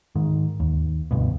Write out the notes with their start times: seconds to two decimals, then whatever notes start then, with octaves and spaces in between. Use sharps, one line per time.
0.15 G#2 D#3
0.60 D#2
1.11 D2 G2 B2